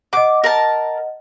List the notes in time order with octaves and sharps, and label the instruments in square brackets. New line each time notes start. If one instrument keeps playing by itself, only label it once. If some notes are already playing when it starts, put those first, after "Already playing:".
[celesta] D#5 F#5 [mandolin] D6
[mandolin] A#4 A5